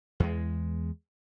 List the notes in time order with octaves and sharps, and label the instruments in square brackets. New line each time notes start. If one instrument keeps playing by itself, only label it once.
[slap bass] E2 G#3